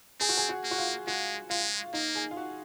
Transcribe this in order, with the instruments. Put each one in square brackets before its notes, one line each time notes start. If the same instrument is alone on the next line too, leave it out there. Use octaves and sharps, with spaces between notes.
[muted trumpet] C4 [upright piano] G#4
[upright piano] F#4
G#4
F#4
[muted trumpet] A#3
[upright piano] F#4
F4
[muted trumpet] G#3 [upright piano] F#4
[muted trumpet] G#3 [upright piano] F4
[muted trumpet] A#3 [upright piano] D#4
[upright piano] G#4
F4
F#4